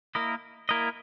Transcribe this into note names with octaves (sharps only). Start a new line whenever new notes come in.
A#3 E4 A#4 D#5
A#3 E4 A#4 D#5